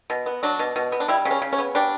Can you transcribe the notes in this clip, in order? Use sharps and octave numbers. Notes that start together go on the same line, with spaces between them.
B2
B3
F#3 D4
B2
B2
B3
D4
G3 E4
C#3
C#4
C#3
C#4
B3
G3 D4